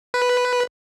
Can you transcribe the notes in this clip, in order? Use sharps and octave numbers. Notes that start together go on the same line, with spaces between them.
B4